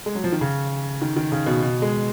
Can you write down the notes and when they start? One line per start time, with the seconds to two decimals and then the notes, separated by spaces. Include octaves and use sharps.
0.06 G#3
0.15 F#3
0.24 F3
0.32 D#3
0.41 C#3
1.02 D#3
1.16 D#3
1.32 C#3
1.46 B2
1.62 B2
1.82 G#3